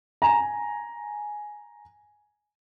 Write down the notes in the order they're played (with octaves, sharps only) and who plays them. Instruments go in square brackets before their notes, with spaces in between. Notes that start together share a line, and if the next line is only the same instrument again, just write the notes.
[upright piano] G#5 A#5